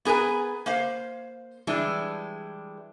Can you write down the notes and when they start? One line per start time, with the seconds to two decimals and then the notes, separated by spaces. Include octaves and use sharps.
0.05 B3 G#4 A#4 B4 G#5
0.66 A#3 C5 F5
1.67 E3 G3 G#3 D4